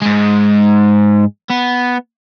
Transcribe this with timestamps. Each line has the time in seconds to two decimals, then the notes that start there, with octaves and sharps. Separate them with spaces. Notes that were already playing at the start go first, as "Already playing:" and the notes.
0.02 G#2 G#3
1.50 B3